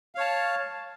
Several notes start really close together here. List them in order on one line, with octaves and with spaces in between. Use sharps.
F5 C#5 A5